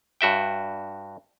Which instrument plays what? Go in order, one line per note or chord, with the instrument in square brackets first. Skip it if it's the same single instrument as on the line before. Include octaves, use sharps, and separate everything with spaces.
[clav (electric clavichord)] G2 F#4 E5 G5